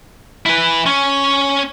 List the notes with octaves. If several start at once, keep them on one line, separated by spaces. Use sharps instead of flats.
E4 B4
C#4